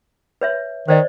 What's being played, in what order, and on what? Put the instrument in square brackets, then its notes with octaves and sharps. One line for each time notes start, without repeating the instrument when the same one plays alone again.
[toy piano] B4 C#5 E5
[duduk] D#3 [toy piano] C5 D5 D#5